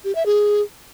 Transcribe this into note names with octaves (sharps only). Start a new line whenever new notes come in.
G4
E5
G#4